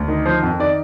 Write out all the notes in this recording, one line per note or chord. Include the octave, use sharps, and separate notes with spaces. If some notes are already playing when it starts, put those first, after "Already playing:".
Already playing: D2
D#3
F3 C5
F2
D#3 D5